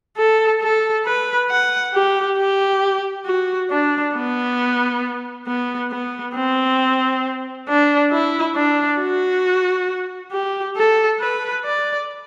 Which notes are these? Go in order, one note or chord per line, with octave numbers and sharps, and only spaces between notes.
A4
A4
B4
F#5
G4
G4
F#4
D4
B3
B3
B3
C4
D4
E4
D4
F#4
G4
A4
B4
D5